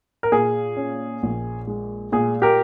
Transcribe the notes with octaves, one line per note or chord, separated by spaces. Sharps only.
A#4
A#2 G#4
C#4
A#1
G#3
A#2 G#4
G4 A#4